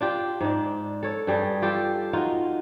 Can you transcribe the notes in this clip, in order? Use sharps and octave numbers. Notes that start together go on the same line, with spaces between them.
D4 F4 G4
G#2 D4
A4 C#5
G2 G3 G#4
F4 G4 A4
D#4 F4 F#4